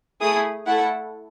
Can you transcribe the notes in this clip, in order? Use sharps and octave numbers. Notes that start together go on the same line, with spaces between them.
A3 E4 G#4 D#6
A3 E4 A4 F#5